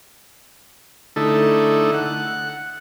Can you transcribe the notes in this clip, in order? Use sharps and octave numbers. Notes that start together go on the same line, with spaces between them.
D3 A3 D#4 E4 A4
F#5